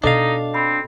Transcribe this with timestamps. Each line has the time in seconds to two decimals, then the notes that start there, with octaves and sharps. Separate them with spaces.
0.04 B2 D4 D#4 A4 D#5 F5
0.54 C4 B5